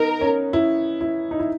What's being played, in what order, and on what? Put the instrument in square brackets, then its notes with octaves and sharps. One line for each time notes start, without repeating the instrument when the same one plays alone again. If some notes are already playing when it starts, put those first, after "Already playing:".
Already playing: [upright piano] B3 D#4 [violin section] A#4
[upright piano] C#4
E4
E4
D#4
E4